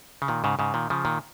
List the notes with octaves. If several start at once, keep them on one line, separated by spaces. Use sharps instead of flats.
C#3
A#2 D#3
G#2 C#3
G#2 C#3
A#2 D#3
C#3 F3
A#2 D#3